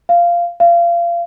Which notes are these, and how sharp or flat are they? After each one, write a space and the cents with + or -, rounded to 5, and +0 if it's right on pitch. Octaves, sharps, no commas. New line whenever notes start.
F5 -15
F5 -30